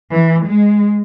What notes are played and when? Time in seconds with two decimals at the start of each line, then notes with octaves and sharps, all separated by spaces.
0.12 E3
0.46 G#3